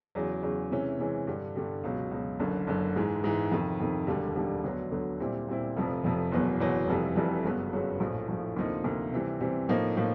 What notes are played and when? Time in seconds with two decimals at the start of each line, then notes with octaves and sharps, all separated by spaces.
0.15 E2 C#3 F#3
0.43 E2 C#3 F#3
0.71 C3 E3 G#3 C#4
0.99 C3 E3 G#3 C#4
1.27 G2 D3 G3
1.56 G2 D3 G3
1.84 C#2 B2 F#3
2.11 C#2 B2 F#3
2.40 F#1 F#2 D3
2.67 F#1 F#2 D3
2.96 G#2 E3 G#3
3.24 G#2 E3 G#3
3.52 F2 C3 D#3
3.80 F2 C3 D#3
4.07 E1 D#2 D3 G3
4.35 E1 D#2 D3 G3
4.64 D2 D3 F#3 B3
4.91 D2 D3 F#3 B3
5.20 A#2 G3 C4 E4
5.48 A#2 G3 C4 E4
5.76 F1 F2 C3 F3
6.04 F1 F2 C3 F3
6.32 F#1 E2 B2 F#3 B3
6.60 F#1 E2 B2 F#3 B3
6.88 F1 F2 C3 E3 G3
7.16 F1 F2 C3 E3 G3
7.44 G1 F#2 C#3 F#3 B3
7.72 G1 F#2 C#3 F#3 B3
8.00 A#1 A2 F3
8.28 A#1 A2 F3
8.56 D2 C3 F3 A#3 D#4
8.84 D2 C3 F3 A#3 D#4
9.12 C3 E3 G3 C4
9.41 C3 E3 G3 C4
9.69 A2 F3 A#3 D#4
9.97 A2 F3 A#3